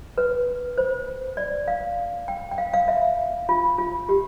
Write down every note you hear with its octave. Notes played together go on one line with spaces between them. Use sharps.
B4
C5
D5
F5
G5
G5
F5
F5
E5
F4
F4
G4